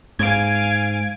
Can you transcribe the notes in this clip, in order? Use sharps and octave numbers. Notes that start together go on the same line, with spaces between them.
G#2 F5 G#5 G#6 D7